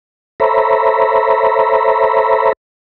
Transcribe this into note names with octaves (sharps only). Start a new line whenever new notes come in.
A4 C5 C#5 E5 A#5 B5